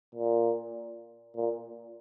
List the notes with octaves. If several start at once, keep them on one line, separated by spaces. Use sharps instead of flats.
A#2
A#2